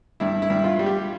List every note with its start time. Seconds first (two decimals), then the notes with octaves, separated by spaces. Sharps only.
0.20 G2 E4
0.42 E4
0.50 G2
0.64 F4
0.79 G3
0.86 G4